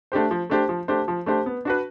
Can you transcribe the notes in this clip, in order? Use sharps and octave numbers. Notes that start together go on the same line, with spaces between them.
A3 D4 G4 C5
F3
A3 D4 G4 C5
F3
A3 D4 G4 C5
F3
A3 D4 G4 C5
B3
D4 F#4 B4